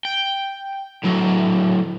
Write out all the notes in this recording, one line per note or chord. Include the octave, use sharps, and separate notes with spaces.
G5
A2 F#3